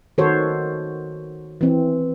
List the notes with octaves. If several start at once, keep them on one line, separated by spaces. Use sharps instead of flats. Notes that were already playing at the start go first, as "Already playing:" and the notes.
D#3 F#4 A4 C5 C#5
E3 C4